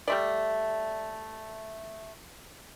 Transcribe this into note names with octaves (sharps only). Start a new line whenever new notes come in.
G3 A3 D5